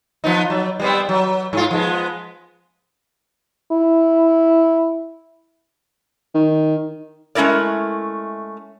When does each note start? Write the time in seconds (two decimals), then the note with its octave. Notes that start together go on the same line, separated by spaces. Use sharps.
0.24 F3 B3 D#4
0.50 F#3
0.80 G3 B3 C4
1.09 F#3
1.53 G#2 F4
1.71 F3 G#3 B3
3.72 E4
6.35 D#3
7.35 G#3 A3 C#4 E4 A#4 D5